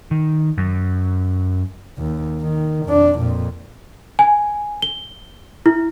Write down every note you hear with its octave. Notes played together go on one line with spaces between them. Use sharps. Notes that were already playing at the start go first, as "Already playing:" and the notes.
D#3
F#2
D#2
D#3
F2 D4
F2 A#2
G#5
G7
E4